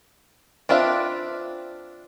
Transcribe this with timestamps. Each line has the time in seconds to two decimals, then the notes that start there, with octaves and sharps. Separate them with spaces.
0.69 C4 D4 F4 B4 E5